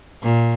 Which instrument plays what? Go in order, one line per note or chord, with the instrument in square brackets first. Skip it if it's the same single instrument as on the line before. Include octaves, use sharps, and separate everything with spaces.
[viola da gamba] A#2